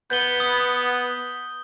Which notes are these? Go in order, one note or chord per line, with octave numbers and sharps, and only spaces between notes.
B3 G6 G7
D#6